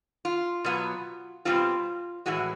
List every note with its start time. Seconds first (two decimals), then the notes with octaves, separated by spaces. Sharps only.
0.25 F4
0.64 B2 F#3 B3
1.45 B2 G3 C4 F4
2.26 A2 E3 G#3 F#4